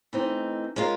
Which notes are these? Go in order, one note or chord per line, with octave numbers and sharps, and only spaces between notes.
E3 A3 C4 D#4
G#3 C#4 F4 A#4